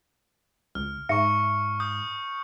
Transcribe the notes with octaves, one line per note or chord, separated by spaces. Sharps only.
C#2 F6
G#2 E5 A#5 C#6 C#7
D#6 G6